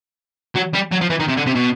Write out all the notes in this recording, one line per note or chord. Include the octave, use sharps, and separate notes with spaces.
F#3
G3
F#3
F3
E3
D#3
C3
D3
C3
B2